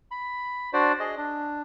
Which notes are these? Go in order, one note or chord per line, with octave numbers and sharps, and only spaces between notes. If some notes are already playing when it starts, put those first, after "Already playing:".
B5
D4 F#4 C5 D5
G#4 D#5
D4